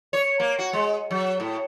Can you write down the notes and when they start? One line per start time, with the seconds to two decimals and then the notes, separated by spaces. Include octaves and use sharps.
0.13 C#5
0.40 A#3
0.59 F#4
0.73 G#3
1.11 F#3
1.40 A2